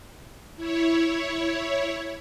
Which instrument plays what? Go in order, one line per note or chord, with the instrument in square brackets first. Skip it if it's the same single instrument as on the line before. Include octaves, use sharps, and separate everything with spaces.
[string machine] E4 C#5